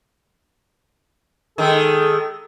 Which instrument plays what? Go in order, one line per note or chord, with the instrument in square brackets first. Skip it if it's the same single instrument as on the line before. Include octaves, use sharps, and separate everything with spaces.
[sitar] D#3 G#3 [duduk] A4